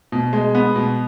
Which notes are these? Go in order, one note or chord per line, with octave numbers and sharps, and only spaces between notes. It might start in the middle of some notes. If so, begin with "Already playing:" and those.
B2
G#3
B3
B2